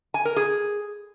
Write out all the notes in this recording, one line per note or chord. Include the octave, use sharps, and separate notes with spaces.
G#5
A#4
G#4